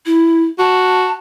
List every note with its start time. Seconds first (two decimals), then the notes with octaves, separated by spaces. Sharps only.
0.06 E4
0.59 F#4 A5